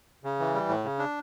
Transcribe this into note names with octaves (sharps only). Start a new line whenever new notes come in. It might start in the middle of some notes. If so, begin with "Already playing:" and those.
C#3
E3
G3
A2
C#3
D4